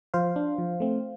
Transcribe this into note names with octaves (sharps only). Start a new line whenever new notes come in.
F3 C5 F5
D4
F3
A3 C4